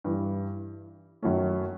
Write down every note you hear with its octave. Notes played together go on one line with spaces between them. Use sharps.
G2 E3 G3
F#2 D#3 F#3 A3 C#4